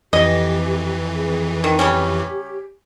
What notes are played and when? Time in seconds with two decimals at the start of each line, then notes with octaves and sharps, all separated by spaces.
0.13 F2 E3 G4 D#5
1.15 G#4
1.64 D#3
1.79 C#3 G3 C#4 G4